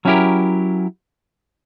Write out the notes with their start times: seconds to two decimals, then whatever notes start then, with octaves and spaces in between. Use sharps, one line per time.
0.05 F#3 C#4 E4 G4 A#4